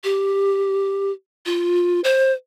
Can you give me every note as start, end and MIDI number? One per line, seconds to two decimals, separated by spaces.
0.04 1.10 67
1.46 2.01 65
2.04 2.33 72